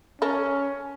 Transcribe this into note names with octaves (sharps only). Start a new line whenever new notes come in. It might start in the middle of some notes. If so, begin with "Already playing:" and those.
C#4 A4 A#4